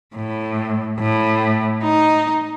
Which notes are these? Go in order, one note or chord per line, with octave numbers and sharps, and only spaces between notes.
A2
A2
D#4